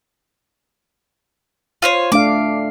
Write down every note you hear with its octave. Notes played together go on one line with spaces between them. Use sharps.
F4 C5 C#5
A3 D4 F5 D6